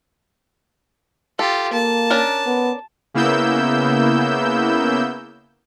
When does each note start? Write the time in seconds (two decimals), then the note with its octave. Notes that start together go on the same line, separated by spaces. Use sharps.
1.39 F4 G4 A4
1.73 A#3 A5
2.10 C#4 D4 A#4
2.46 B3
3.14 C#3 A#3 B3 E4 E6 G6